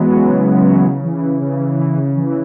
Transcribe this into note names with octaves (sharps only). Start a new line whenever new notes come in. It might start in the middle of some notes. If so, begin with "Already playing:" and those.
Already playing: E3 F#3 G#3 B3
C#3 F#3
E3
C#3
C#3 F#3
E3
C#3
E3
C#3
E3
E3
C#3
E3